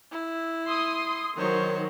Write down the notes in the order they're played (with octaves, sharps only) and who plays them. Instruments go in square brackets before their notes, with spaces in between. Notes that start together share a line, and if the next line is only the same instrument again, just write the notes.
[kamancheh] E4
[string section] C6 D#6
[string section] D#3 F#3 [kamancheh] C5 C#5